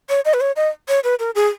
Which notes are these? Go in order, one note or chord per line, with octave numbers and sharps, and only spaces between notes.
C#5
D#5
B4
C#5
D#5
C#5
B4
A#4
G#4